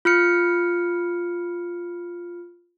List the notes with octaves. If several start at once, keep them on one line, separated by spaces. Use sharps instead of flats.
F4 F6 C#7